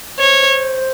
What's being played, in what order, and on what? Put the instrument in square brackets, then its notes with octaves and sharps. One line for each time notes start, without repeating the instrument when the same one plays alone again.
[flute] C5 [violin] C#5